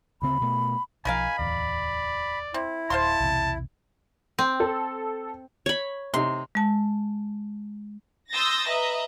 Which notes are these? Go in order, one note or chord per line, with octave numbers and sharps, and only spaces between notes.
D2 C#3 C4 B5
B2 A3
B1 F3 D#4 A#4 F5 G#5 B5
D1 E2 D5
C4 E4
D1 C5 F5 A5 C6
B1 E2 C3
C4
A4
C#5 B5
C3 D#4 C6
G#3 A5
C6 D#6 E6 G6 A6 A#6
B4 D#5 E5 A#5